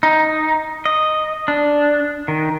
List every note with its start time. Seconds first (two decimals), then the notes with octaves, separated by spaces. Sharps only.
0.03 D#4
0.85 D#5
1.48 D4
2.28 D#3